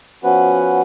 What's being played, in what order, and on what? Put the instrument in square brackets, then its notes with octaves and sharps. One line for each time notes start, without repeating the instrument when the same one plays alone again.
[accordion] F3 B3 C#4 F#4 B4